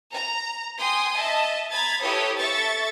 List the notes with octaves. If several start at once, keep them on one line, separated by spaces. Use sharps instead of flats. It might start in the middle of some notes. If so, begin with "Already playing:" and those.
A#5
G5 G#5 C6 D#6
D#5 E5 A5
A#5 B5 G#6 A6
E4 G4 A4 B4 C#5 D#6
A4 E5 C#6 A6